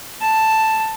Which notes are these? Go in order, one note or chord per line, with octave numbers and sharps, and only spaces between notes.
A5